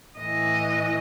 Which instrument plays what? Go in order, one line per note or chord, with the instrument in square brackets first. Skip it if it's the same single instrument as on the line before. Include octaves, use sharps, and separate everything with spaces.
[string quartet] A2 E3 D#5